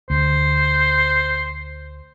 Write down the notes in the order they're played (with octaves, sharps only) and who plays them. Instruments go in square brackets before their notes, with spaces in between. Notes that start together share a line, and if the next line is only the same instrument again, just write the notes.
[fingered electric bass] D2 [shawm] C5